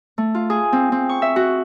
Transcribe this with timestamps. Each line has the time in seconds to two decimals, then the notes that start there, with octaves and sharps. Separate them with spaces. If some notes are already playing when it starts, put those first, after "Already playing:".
0.18 A3
0.35 F4
0.50 G#4
0.73 C4
0.92 C4
1.09 C#6
1.22 E5
1.36 F#4